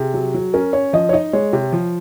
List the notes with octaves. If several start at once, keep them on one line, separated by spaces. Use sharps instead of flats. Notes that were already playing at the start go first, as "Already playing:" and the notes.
Already playing: C3 G#4
F#3
F#3
C#4 A#4
C#4 C#5
F3 D#5
C#5
D#4 D#5
G#3 C#5
C3
F3